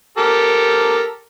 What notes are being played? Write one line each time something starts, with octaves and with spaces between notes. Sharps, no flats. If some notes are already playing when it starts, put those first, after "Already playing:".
G4 A4 A#4